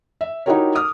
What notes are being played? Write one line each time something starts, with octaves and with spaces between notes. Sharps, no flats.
E5
D#4 E4 F#4 G4 A#4 C#5
D6 D#6 F6